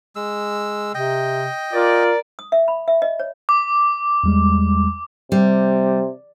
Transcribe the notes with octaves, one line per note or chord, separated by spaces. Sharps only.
G#3 E6
C3 D#5 G5
F4 A#4 D5
D#6
E5
B5
E5
D#5
C#5
D6
E2 G3 G#3
C3 G3